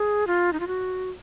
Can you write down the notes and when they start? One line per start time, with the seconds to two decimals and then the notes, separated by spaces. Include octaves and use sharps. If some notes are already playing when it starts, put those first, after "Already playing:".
Already playing: G#4
0.27 F4
0.53 D#4
0.60 F4
0.67 F#4